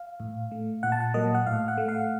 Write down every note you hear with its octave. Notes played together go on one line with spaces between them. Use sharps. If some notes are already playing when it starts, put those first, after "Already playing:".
Already playing: F5
A2
A3
A#2 F#5
A5
F#5
F#3 A#3 D#5
F#5
A2 F5
F#5
A3
F5